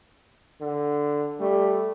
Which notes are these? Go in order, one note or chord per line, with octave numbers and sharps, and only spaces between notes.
D3
G3 A3